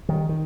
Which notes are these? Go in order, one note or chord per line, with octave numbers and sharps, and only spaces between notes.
D#3 G3
D#3